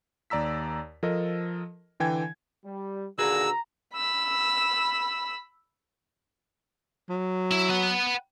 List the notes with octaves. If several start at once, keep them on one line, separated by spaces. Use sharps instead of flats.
D#2 D5 A#5 E6 B6
F3 A4 A#4 D#5
D3 E3 G5 G#5 G#6
G3
A#2 D3 D#3 F#4 G#4 B4 A#5 E6
B5 E6
F#3
E4
B4 F#5